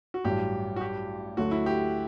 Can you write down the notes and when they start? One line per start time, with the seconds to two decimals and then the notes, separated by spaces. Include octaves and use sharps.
0.14 F#4
0.24 A1 G2 F#3 G4
0.76 F#4
0.81 G4
1.37 D2 D3 F#3 A3 F#4
1.51 E4
1.66 G4